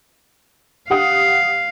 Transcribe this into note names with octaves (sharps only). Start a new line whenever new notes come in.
G4 F5 F#5 D#6